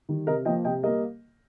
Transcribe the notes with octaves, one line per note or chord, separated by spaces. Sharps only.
D#3 G3
C3 A#4 D#5
F3 A#3 D#5 G5
C3 D#5 G5
G3 A#3 A#4 D#5